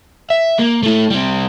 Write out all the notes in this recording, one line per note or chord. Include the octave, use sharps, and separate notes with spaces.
E5
A#3
A3 E4
G3 C4